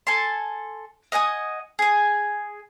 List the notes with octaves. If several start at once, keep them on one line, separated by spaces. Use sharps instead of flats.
A4 G#5 A5 C6
D#5 F#5 G#5 D#6
G#4 G#5